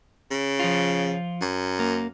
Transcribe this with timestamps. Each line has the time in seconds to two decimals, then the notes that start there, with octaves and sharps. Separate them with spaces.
0.31 C#3
0.59 F3 F4
1.41 F#2
1.79 A#3